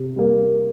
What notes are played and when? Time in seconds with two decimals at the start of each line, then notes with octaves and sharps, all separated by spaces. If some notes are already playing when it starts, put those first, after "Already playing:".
Already playing: C3
0.16 G3 A#3